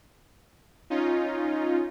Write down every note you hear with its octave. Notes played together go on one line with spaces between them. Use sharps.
C#4 D#4 F4